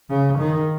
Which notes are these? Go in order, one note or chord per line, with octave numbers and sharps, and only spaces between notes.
C#3
D#3